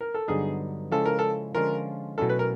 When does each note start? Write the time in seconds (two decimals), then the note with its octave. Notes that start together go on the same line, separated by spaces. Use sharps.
0.01 A#4
0.14 A4
0.28 G2 D3 F#3 B3 D#4 G#4
0.92 C#3 F3 G#3 C#4 E4 A4
1.06 A#4
1.19 A4
1.55 D3 F3 G#3 C#4 F4 A#4
2.18 B2 F#3 A3 C#4 E4 A4
2.29 B4
2.39 A#4